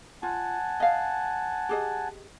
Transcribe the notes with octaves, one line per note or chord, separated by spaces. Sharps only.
F4 F#5 G#5 A5
D#5 F5
G4 G#4 D#5